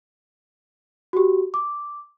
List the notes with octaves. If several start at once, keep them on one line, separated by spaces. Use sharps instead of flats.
F#4 G4
D6